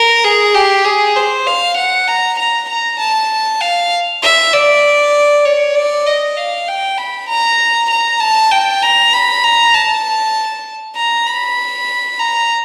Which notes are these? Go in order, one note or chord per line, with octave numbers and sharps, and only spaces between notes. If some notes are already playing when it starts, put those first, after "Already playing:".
Already playing: A#4
G#4
G4
G#4
C5
F5
F#5
A#5
A#5
A#5
A5
F5
E5
D5
C#5
D5
D#5
F5
G5
B5
A#5
A#5
A5
G5
A#5
B5
A#5
A5
A#5
B5
A#5